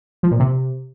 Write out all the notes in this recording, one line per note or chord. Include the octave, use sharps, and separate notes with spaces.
F3
A#2
C3